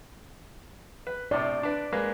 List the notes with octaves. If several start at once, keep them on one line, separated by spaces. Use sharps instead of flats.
B4
A2 C3 D5
D4 B4
G#3 A#3 B4